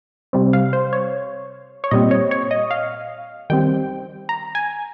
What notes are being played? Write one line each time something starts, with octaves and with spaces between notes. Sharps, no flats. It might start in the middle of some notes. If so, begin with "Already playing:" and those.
C3 G3 C4
F5
C5
C#5
C#5
A#2 G3 C4 D#5
C#5
C#5
D#5
F5
D#3 G3 C4 G5
A#5
G#5